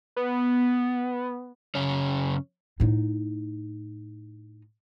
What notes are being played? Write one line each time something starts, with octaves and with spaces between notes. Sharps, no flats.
B3
F#2 C#3 C#4 C#5
A2 D#4